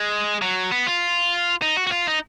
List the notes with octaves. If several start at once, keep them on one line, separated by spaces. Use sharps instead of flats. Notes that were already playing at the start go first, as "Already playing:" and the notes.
Already playing: G#3
F#3
B3
F4
D#4
F#4
F#4
F4
D#4